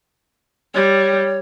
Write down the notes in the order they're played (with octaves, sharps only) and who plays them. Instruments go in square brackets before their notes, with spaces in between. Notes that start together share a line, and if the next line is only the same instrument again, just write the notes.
[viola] G3 [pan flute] C#5